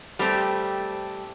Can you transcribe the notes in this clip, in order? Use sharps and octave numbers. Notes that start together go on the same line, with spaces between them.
G3 A3 C4